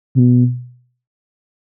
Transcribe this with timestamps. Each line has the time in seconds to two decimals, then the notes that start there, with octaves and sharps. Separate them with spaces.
0.15 C3
0.19 B2